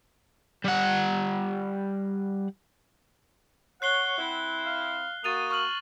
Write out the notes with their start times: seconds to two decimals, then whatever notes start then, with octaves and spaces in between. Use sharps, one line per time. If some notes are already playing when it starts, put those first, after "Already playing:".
0.65 G3 F#5
3.82 C#5 F#5 F#6 C7 G7
4.18 C4 E4
4.66 F5
5.24 A#3 F#4 D#6 A6 D#7 F7
5.51 C#6 F6 F#7